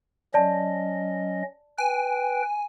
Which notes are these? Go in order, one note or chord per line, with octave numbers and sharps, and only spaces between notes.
F#3 C#4 D5 D#5 A5
B4 G5 G#5